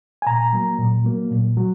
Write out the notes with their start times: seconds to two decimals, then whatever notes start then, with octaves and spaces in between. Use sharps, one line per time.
0.22 G#5
0.26 A#2 A#5
0.53 F#3 A#3
0.79 A#2
1.04 F#3 A#3
1.31 A#2
1.57 F#3